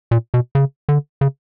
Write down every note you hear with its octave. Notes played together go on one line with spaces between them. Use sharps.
A#2
B2
C#3
D3
C#3